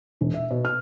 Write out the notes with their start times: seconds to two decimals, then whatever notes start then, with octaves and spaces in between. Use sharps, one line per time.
0.21 E1
0.34 E5
0.51 B2
0.65 F6